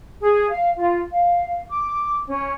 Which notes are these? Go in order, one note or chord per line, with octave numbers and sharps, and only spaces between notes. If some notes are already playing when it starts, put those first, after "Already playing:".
G#4
F5
F4
F5
D6
C#4